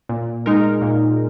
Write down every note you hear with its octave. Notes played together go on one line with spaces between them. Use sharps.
A#2
G#3 D#4 A#4
A#2